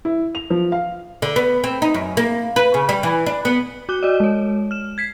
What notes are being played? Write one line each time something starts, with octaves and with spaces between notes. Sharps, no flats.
E4
F7
F3
F5
D3
B3
C4
D#4
F#2
A#3
B4
C#3
G3
E3
D4
B3
F#4 D6 F#6 G7
F#4 D5 D#5
G#3 C#5
F6 E7
G#6 B6 C7